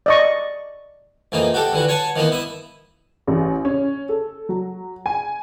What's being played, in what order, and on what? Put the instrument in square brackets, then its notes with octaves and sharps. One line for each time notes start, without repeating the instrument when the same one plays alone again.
[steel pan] D5 D#5 C#6
[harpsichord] F2 E3 A#3 D#4
F#4 G4 A4
D3 E3 F#4
C#5 F#5 G#5 A5
D#3 E3 A#3 B3
E4 D#6
[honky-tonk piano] A1
C#4
A4
F#3
G#5